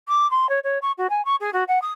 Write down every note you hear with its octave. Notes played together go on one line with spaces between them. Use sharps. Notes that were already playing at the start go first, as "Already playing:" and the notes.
D6
C6
C#5
C#5
C#6
F#4
G#5
C#6
G#4
F#4
F#5
D#6